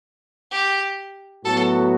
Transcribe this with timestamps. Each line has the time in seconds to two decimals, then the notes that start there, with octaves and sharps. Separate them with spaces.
0.51 G4
1.45 A2 F#3 B3 F#4 A4